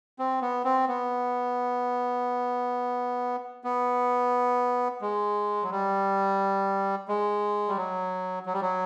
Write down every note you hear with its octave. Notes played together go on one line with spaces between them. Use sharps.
C4
B3
C4
B3
B3
G#3
F#3
G3
G#3
G3
F#3
F#3
G3
F#3